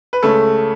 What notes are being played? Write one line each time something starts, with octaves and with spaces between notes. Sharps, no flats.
B4
C#2 C#3 G#3 A3 C#4 A4